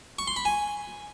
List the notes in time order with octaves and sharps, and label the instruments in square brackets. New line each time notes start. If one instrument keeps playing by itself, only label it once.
[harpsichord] C#6
C6
B5
G#5